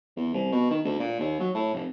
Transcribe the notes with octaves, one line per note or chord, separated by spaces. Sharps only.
E2
C2
B2
D#3
D2
A#2
D#2
F#3
A2
F1